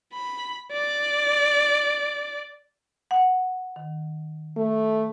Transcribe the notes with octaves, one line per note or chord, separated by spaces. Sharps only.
B5
D5
F#5
D#3
A3